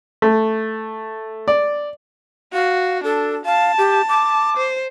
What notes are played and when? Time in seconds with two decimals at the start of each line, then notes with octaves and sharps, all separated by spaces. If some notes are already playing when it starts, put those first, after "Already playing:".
0.22 A3
1.48 D5
2.53 F#4 F5
3.04 D4 A4
3.46 F5 A5
3.78 G4
4.09 D6
4.57 C5